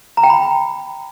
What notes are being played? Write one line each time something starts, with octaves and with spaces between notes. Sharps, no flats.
A#5
G5
B5